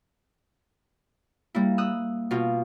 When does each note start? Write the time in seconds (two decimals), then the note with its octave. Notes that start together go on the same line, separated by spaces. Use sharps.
1.55 G3 A#3 E4
1.78 D#6 E6 F#6
2.31 B2 F4